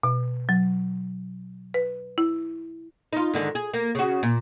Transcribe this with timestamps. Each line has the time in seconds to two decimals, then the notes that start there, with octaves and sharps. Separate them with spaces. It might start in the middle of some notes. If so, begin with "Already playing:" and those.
0.03 B2
0.49 F#3
1.74 B4
2.18 E4
3.13 D#4 F4
3.33 G#2 D3 D#3
3.55 G#4
3.74 A#3
3.95 C#3 F#4
4.23 A#2